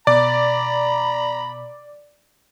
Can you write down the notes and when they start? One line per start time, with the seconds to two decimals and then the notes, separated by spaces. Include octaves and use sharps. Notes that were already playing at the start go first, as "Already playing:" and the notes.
0.07 B2 D5 A#5 B5